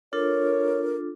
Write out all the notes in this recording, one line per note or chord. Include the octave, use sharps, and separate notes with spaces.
D4 F4 A4 A#4 C#5